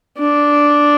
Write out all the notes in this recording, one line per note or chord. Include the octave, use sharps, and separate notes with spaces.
D4